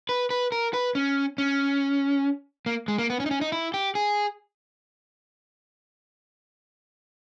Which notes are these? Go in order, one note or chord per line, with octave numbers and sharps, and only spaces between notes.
B4
B4
A#4
B4
C#4
C#4
A#3
G#3
A#3
B3
C#4
D#4
C#4
D#4
E4
G4
G#4